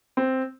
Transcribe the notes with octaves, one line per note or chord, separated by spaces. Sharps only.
C4